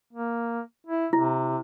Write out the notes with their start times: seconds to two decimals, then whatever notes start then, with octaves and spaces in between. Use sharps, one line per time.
0.13 A#3
0.87 E4
1.13 C3 E4